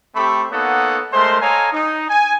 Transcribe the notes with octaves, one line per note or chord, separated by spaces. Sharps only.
A3 C4 G4 A4 B5 C#6
A#3 B3 D#4 A4 C#5 F#5
G#3 A3 A#4 C5 C6
A4 C#5 D#5 F5 G#5 A#5
D#4
G#5